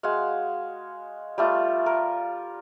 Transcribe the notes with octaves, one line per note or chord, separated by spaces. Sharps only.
G#3 F#4 F5
G3 A3 F4
A#4